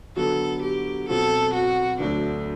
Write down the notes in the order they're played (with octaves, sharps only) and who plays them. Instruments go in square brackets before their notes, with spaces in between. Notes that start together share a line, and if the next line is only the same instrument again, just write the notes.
[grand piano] D3 F#3 B3 F#4 [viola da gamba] A4
[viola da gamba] G4
[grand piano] B2 F#3 C4 F#4 [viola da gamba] A4
[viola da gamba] F#4
[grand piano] D2 D3 F#3 A3 [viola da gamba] D4